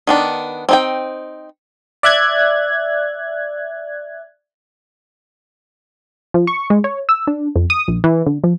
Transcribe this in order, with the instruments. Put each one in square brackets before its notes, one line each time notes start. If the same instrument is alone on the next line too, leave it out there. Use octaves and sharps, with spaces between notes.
[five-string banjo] D#3 B3 D4
C4 D#4 G5
[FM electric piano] D5 E5 F#6 G#6
[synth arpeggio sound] F3
C#6
G#3
C#5
E6
D4
F2
D#6
A#1
E3
D3
F3